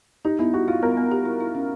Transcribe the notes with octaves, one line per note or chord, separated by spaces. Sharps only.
D#4 G4
B3 E4
F#4 G4
E4 F4
B3 A#4
B3
G4
E4
E4
C#4